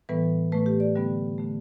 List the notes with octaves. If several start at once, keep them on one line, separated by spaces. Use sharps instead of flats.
A2 E3 G3 B3 B4
A2 A3 B4
G4
D5
D3 G3 B3
D3 A3